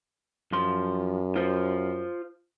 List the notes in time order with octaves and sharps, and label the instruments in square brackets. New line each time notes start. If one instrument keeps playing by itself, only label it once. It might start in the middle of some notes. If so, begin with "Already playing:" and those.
[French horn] F#2 [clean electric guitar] F3 C6
[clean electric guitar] F4 C5